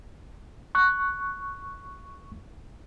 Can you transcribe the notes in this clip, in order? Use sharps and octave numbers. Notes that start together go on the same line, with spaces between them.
C#6 F#6